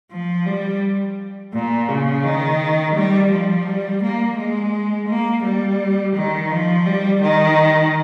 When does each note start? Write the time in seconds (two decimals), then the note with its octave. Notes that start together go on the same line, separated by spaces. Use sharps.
0.11 F3
0.46 G3
1.53 A#2
1.89 C#3
2.24 D#3
2.95 G3
3.31 F3
3.66 G3
4.03 A#3
4.37 G#3
5.08 A#3
5.44 G3
6.15 D#3
6.51 F3
6.86 G3
7.22 D#3